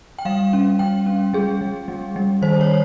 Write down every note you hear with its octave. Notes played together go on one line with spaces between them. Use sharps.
G5
G3 F5
C#4
G3 G5
C#4
G3 G#4
G3
G3
G3
D#3 C5
C#5